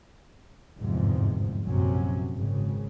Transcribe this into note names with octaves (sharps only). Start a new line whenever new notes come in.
G1 E2 G#2 C3 F3
A#1 F#2 C3 F#3 C#4
G#1 C#3